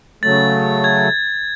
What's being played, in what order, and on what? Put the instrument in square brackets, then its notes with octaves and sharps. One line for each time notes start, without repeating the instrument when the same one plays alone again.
[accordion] C#3 F#3 A3 [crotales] A6
[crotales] G#6